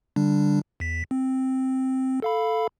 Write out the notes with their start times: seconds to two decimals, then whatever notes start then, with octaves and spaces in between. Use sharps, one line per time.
0.16 D3 G3 D4
0.80 E2 B6
1.11 C4
2.22 A4 F5 B5